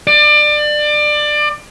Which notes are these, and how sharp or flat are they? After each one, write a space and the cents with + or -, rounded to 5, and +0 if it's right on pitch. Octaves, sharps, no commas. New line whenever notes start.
D5 +25